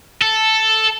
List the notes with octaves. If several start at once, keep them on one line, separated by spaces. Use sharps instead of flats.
A4